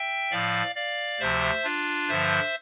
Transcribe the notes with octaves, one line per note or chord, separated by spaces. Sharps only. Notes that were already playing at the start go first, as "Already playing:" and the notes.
Already playing: E5 G5
A2 F3 D5 F5
D5 F5
D2 C3 F3 C5 E5
D4 F4
G2 D3 F3 C5 E5